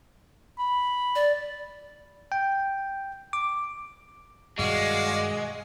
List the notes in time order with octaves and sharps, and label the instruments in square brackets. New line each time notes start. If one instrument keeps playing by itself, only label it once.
[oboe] B5
[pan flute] D5
[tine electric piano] G5
D6
[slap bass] G2 B2 D#3 [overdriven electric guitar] G#3 [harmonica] F#4 D5 F5